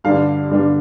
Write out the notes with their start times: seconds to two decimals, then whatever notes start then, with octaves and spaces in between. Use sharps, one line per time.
0.04 G2 D3 G3 D4 F5
0.50 G2 D3 G3 D4